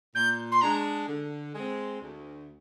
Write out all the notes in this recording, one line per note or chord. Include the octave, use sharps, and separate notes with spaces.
A#2 G6
C6
G#3 D4 A#5
D3
G#3 C4
D2